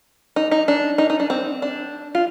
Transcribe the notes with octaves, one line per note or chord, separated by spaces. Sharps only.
D#4
D#4
D4
D#4
D#4
D4
C4
D4
F4